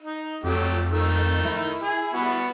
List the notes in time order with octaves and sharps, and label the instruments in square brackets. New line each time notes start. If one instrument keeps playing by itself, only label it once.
[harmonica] D#4
[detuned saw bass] F2 [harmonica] F#3 A3 G4
[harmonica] D#3 A3 D#4
[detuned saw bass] E4
[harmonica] G#4
G3 B3 F#4